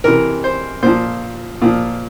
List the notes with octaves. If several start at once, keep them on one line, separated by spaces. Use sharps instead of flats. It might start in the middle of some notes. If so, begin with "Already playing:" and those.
C3 E3 A#4
C5
A#2 F3 C5
A#2 F3